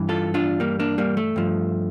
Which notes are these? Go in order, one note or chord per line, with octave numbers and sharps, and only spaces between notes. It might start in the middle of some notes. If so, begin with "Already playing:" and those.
Already playing: G2 E3
F4 A4
D4 F4
G3 A#3
A#3 D4
G3 A#3
A3
G2 F3